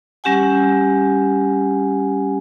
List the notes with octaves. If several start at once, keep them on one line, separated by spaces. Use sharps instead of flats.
G3 C#4 G4 F#5 G#5